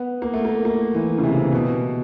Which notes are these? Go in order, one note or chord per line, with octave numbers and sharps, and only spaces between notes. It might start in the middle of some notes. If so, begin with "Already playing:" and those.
Already playing: B3
A#3
A3
A#3
A#3
E3
C#3
C3
B2